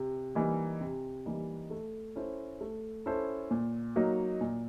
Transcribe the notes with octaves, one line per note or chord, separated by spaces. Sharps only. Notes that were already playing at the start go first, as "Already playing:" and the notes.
Already playing: C3
E3 G3 A#3 D#4
C3
E3 G3 A#3 D#4
A3
C#4 E4 A4 C5
A3
C#4 E4 A4 C5
A#2
F#3 A#3 D#4 F#4
A#2